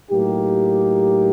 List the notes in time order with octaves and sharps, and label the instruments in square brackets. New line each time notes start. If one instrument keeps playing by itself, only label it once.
[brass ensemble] A2 F#3 A#3 D#4 G4